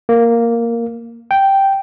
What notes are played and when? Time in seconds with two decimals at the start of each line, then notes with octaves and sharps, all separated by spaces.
0.09 A#3
1.31 G5